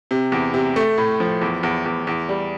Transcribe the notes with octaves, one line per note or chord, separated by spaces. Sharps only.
C3
E2
C3
A3
A2
F3
E2
E2
E2
E2
G3